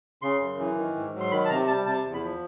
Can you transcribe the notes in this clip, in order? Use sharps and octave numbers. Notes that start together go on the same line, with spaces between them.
C#3 C6
F#2
E3
D#3
G#2
F#3
C6
D#3 B5
A5
C3 A#5
G3 A5
C3 A5
E2
B5
F3